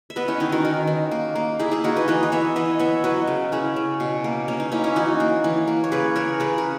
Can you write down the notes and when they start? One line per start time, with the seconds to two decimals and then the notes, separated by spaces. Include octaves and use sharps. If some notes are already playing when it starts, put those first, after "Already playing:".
0.10 E5
0.16 B3 B4 D#5
0.28 C#4 E4
0.40 D#3 D#4
0.52 F#4 A#4
0.65 D#3
0.87 D#3
1.11 A#3
1.35 A#3
1.59 A#3 E4 G#4
1.71 E4 G#4
1.84 A#3 D#4 F#4
1.96 B4 D#5
2.08 E3 B4 D#5
2.23 D#5
2.32 B3 C#5 E5
2.56 E3 B4 D#5
2.79 B3 C#5 E5
3.04 F#3 B4 D#5
3.27 C#3
3.52 C#3 C#4 E4
3.76 C#3
4.00 B2
4.24 A#3
4.48 A#3 C#4
4.60 D#4
4.72 A#3 C#4 E4
4.84 C#4 E4
4.96 E3 D#4 F#4
5.20 A#3
5.44 E3
5.67 A#3
5.84 C#5
5.92 C#3 G#4 B4
6.16 C#3 A#4 C#5
6.40 C#3 G#4 B4
6.58 A#4